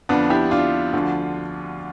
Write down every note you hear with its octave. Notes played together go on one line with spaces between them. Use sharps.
F2 D3 F3 B3 D4
E4 G4
D4 F4
D2 D3 F3